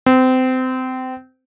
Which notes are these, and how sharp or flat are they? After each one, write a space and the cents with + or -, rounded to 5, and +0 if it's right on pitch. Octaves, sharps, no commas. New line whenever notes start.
C4 -25